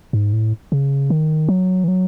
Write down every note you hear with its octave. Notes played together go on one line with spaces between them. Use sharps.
G#2
A2
C#3
D#3
F#3
E3
F#3